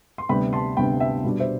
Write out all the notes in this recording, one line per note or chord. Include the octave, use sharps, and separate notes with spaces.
C6
D2 C3 G3 B3 G5 B5
A5 C6
D2 C3 G3 B3 G5 B5
E5 G5
B2 G3 D4
C5 E5